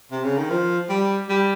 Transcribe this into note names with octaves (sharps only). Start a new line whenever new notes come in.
C3
C#3
D#3
F3
G3
G3